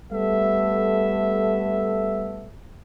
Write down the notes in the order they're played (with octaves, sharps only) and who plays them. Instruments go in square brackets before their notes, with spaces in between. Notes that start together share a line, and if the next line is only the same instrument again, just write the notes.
[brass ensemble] G3 A3 B3 A4 E5